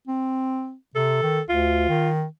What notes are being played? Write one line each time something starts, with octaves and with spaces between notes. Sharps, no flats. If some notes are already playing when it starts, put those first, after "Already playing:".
C4
C3 A4
D#3
D2 F4
D#3